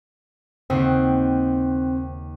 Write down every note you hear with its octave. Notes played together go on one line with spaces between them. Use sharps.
D#2 C#3 C4 F#5